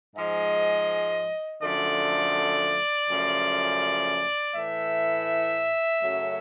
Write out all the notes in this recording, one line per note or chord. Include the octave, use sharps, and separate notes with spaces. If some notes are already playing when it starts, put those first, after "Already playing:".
G#2 F3 G#3 D#5
F#2 D3 F3 A3 D5
F#2 C#3 F3 A3
A2 E3 A3 E5
F#2 C#3 F#3 A3